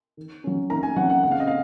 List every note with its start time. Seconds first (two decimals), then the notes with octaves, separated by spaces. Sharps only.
0.17 D#3
0.44 F#3 C#4
0.70 D#3 A#5
0.83 G#5
0.96 F#3 C#4 F#5
1.10 F#5
1.23 C#3 F#5
1.31 F5
1.40 D#5
1.47 F5